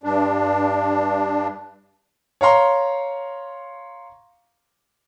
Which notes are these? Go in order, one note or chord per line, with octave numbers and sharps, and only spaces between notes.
G2 D4
C#5 F5 A#5 C6